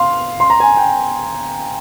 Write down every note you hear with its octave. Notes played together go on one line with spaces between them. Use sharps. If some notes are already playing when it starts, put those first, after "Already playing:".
Already playing: F5 C6
C6
A#5
G#5
G5